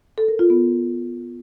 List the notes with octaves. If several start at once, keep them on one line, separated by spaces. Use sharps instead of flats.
A4
A#4
F4
B3